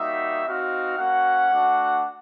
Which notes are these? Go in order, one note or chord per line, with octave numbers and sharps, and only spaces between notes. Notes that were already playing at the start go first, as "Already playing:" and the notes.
Already playing: G3 A#3 D#4 F#4 E5
C4 D#4 F#4 F5
A#3 C#4 F#4 F#5
A3 D4 F#4